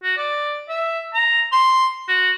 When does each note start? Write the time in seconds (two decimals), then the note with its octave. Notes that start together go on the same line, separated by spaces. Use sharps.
0.03 F#4
0.18 D5
0.69 E5
1.14 A#5
1.52 C6
2.08 F#4